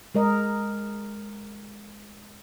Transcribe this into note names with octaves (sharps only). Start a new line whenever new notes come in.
G#3 A#4 D#5